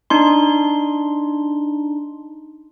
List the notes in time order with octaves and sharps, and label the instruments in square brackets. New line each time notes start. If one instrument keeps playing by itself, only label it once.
[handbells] D4 D#4 C6